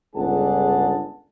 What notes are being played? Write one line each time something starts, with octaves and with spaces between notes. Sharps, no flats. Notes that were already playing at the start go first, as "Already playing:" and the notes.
G1 C#2 D4 G#4 F#5 A5